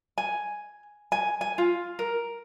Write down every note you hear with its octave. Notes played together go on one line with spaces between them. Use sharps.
G#5
G#5
G#5
F4
A#4